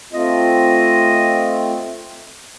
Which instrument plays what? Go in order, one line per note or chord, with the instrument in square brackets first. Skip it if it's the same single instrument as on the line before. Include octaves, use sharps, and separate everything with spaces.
[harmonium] A3 C4 F4 [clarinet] D#5